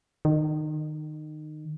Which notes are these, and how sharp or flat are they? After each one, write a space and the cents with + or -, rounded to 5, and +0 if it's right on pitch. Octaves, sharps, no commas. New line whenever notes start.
D#3 -25